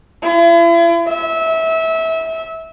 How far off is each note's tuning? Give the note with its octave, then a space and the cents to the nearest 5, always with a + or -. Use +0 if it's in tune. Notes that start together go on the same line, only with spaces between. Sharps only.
E4 +45
E5 -25